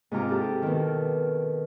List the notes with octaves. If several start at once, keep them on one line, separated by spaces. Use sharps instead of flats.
G#2 C3 F4 A#5 D6
E4 G4 A4
B2 D#3